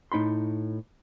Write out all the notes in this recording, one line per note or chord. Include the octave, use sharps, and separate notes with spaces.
A2 D#4 B5 C6